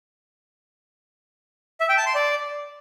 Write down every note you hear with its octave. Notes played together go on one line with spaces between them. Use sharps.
E5
G5
A5
C6
D5